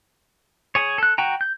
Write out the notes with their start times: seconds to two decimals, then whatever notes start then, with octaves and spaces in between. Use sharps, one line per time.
0.75 G#4 C#5
0.98 A4 F#6
1.18 F#4 G5 A#5
1.41 G6